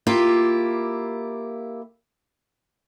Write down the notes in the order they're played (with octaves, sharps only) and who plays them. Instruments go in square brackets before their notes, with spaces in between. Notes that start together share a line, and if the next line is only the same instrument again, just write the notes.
[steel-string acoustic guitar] A#3 E4 F4 G4